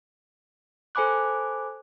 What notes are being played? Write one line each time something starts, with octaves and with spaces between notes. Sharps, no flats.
A4 C5 G#5 B5 D6 F#6